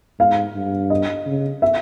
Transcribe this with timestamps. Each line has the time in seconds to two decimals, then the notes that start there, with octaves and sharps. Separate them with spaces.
0.19 G#2 F5
0.55 G2
0.90 D#5
1.26 C#3
1.62 E5